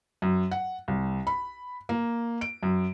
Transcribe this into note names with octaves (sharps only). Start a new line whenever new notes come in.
F#2
F#5
C2
B5
A#3
D7
F#2